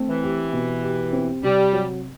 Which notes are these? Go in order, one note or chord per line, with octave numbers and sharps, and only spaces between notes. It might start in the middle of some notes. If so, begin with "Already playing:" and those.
Already playing: A3 C4
E3
G4
B2
G4
C4
C3 G3
F#3